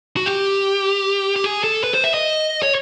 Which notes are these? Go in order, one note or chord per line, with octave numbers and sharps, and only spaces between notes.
F#4
G4
G4
G#4
A4
B4
C5
E5
D#5
C#5